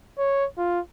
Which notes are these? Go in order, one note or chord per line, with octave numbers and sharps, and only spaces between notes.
C#5
F4